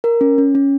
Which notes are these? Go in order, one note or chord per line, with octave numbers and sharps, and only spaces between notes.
A#4
C#4
C#4
C#4